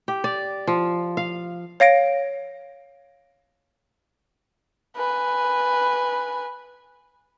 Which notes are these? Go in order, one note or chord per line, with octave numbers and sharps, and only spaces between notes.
G4
D5
F3
F5
C#5 F5 A#6 D7
B4 G#5